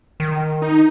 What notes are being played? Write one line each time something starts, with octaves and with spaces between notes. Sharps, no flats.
D#3
D#4